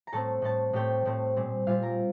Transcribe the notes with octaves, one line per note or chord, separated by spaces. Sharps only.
A#5
A2 A3 C4 A4 A5
A2 A3 C4 A4 A5
A2 A3 C4 G4 G5
A2 A3 C4
A#2 G3 C4
A#2 G3 C4 F4 F5
A#4 A#5